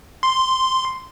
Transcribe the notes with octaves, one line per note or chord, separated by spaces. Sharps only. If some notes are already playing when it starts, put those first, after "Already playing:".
C6